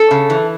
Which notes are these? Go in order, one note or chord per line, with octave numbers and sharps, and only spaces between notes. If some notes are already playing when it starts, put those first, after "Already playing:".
Already playing: A4
C#3
E3